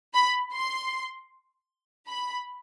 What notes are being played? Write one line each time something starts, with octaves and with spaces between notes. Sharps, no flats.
B5
C6
B5